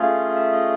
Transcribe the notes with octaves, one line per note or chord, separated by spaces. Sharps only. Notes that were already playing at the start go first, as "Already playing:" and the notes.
Already playing: A3 C#4 F4 G#4 F5
E5
D#5